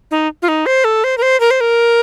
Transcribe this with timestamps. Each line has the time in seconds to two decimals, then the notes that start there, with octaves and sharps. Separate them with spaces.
0.11 D#4
0.42 F4
0.48 D#4
0.66 C5
0.84 A4
1.04 C5
1.18 A#4
1.22 C5
1.40 A#4
1.51 C5
1.61 A#4